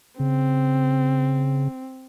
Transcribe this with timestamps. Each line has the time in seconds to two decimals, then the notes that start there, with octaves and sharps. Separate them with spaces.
0.20 C#3 C4